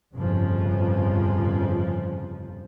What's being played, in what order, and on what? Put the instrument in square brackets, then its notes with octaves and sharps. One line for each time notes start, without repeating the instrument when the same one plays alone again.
[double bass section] G1 F2 A2 C#3 F3